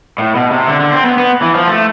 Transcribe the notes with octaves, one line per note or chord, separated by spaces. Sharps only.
A2
B2
C3
D3
D3
C4
B3
B3
E3
F3
A3